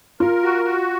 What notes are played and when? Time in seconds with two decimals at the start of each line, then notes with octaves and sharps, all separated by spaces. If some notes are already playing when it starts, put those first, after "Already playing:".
0.20 F4 A#4
0.43 F#4
0.65 F#4